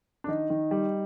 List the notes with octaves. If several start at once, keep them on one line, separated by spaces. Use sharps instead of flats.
D4
D#3 D#4
D#3
G3